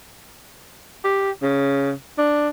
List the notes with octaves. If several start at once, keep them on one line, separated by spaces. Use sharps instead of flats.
G4
C#3
D4